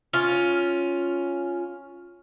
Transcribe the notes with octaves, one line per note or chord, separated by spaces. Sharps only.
C#4 F4